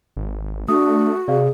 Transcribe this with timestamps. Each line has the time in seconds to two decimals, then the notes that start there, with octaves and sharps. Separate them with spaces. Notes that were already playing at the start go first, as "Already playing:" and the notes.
0.17 G#1
0.68 A3 D4 F#4 D#6
1.28 C3 G#4 D5 F5